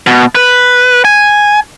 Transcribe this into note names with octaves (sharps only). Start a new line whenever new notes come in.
B2
B4
G#5